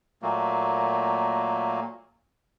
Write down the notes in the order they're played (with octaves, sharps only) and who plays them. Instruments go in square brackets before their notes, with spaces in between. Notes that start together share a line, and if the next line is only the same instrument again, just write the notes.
[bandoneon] A#2 F#3 A3 A#3